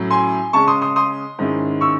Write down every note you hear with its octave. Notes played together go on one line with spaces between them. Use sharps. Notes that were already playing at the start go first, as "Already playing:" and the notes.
Already playing: A2 F#3 C#4 E4
G#5 C6
C#3 G#3 C#4 A5 C#6
C6 D#6
C6 D#6
C6 D#6
G#2 D#3 G#3 C#4 E4
C#6 E6